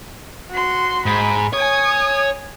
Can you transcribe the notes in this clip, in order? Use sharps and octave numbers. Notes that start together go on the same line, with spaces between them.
F#4 C6
G#2 B5
C#5 G#5 D#6